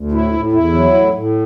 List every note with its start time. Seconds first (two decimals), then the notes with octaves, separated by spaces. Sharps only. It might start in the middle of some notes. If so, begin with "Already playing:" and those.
Already playing: D2
0.12 A2 E4
0.33 A2
0.52 E2 E4
0.74 F#3
0.94 A2
1.14 A2